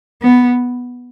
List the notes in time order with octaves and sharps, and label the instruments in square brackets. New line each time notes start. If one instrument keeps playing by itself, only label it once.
[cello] B3